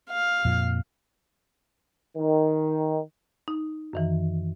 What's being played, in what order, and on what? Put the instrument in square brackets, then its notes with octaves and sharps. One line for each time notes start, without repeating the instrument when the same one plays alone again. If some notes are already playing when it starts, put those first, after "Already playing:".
[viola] F5
[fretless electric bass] F2 A#2 F3
[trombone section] D#3
[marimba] D#4
F#2 D#3 E3